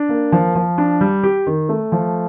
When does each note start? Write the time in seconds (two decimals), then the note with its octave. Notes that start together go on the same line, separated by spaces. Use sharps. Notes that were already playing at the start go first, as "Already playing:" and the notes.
Already playing: D4
0.09 A#3
0.32 F3
0.55 F3
0.78 D4
1.01 G3
1.23 G4
1.47 D#3
1.69 A3
1.92 F3